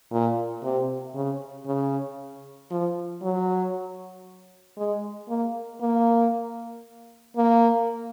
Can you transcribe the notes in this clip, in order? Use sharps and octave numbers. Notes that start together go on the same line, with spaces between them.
A#2
C3
C#3
C#3
F3
F#3
G#3
A#3
A#3
A#3